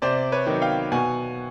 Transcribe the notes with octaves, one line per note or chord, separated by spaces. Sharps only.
C3 C5 D5
B4 C#5
D#3 F#3
F5 G5
B2 F#5 G#5